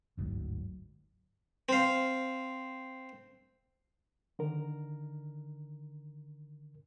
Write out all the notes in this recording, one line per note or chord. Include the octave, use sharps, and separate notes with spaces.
G1 D2 G#2 F#3
C4 F5
D3 D#3 A#4